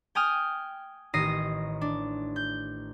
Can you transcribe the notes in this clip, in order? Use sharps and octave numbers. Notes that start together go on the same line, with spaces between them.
G5 G#5 D#6 F6
A1 D#3 D#5 A#6 C7
D4
G6